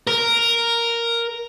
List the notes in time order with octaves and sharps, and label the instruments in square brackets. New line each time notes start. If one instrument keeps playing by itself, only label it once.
[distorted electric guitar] A#4